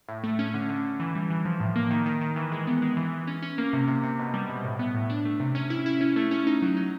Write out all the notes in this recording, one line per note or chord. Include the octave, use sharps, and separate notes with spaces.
A2
A3
C#4
D3
D3
D3
E3
G3
E3
F3
A2
A#3
D#3
D#3
D#3
E3
G#3
B3
G#3
E3
E3
C#4
C#4
A#3
C3
C3
C3
B2
G3
B2
A2
B3
A2
D4
A3
C3
C#4
E4
E4
C#4
A3
C#4
D#4
F#3
D#4